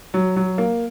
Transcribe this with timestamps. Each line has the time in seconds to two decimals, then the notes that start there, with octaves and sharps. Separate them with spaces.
0.14 F#3
0.36 F#3
0.58 A#3